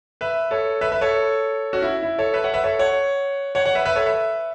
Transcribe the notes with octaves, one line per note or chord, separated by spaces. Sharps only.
B4 E5
A4 C#5
B4 E5
B4 E5
A4 C#5
C#4 F#4
E4
E4
A4 C#5
B4 E5
C#5 F#5
B4 E5
A4 C#5
C#5 F#5
C#5 F#5
C#5 F#5
B4 E5
B4 E5
A4 C#5
B4 E5